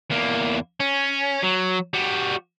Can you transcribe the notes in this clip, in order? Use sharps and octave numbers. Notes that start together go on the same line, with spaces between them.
E2 A#3
C#4
F#3
G3 F#4